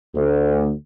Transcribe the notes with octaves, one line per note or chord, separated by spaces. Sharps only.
D2